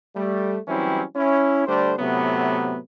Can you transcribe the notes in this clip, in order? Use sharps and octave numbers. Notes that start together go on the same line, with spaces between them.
G3 A3
E3 F#3 G3 C4 C#4 E4
C#4 E4
D3 G3 A3 D4 C5
A2 C3 F#3 A3 B3